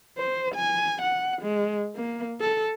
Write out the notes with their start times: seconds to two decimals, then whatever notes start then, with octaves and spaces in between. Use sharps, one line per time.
0.18 C5
0.55 G#5
1.02 F#5
1.42 G#3
1.96 A#3
2.41 A4